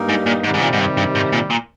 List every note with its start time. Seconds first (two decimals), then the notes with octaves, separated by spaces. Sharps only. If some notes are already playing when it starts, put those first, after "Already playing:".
Already playing: G2 G3 A#3 D#4
0.09 G#2
0.26 A#2
0.43 G#2 C3 D#3 G3
0.54 G#2
0.61 A#2
0.73 G#2
0.79 G2
0.97 G2
1.15 G#2
1.33 A#2
1.51 A#2